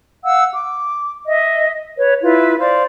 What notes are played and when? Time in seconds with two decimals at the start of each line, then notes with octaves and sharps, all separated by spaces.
0.25 F5 F#5 E6
0.53 D6
1.26 D#5 E5
1.99 B4 C#5
2.22 E4 F4 B4
2.60 C5 D5 F5